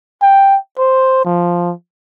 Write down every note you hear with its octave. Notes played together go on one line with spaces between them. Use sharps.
G5
C5
F3